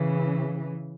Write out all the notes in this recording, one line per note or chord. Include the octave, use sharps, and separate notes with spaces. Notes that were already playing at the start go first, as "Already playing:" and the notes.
Already playing: C#3 E3